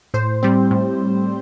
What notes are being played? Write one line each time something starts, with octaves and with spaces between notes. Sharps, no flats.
A2 C5
G3 C4
A2